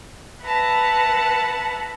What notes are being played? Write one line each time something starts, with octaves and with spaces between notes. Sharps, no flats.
B4 E5 F#5 A5 A#5